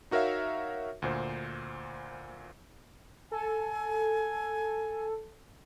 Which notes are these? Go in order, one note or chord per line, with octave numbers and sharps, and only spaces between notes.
D#4 F#4 A#4 C#5 E5 F5
D2 A#2 C5
A4 G#5